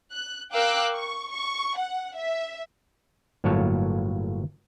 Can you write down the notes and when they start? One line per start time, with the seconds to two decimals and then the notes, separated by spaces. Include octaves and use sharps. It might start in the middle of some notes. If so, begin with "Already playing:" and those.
0.12 F#6
0.52 A#4 F5 G5 D6 E6 F#6
0.94 C#6
1.32 C#6
1.76 F#5
2.16 E5
3.44 G1 A2 F#3 A#3 C#5 A5